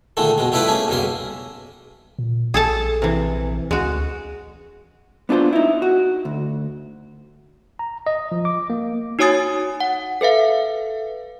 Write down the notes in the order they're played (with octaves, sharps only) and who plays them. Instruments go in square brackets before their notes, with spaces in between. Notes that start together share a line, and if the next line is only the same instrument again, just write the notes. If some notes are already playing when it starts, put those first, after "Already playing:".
[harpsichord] A#2 D3 D#3 G#3 A3
B2 G#3
G3 A3 E4 F4 B4 F5
A3 A#3 C#4 G#4
B1 G2 C#3 A#3 C6
[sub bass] A#2
[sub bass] A#1 [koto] G#4 A4 A5
[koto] C3 E3
[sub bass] D2 [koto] G#3 F#4
[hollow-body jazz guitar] B3 D4 F4 A4 C5
D#4 E4
F#4
D2
[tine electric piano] A#5
D#5
F3
D6
A#3
[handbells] D#4 F#4 C#5 G#5 D#6 A6
F#5
A4 B4 E5 F5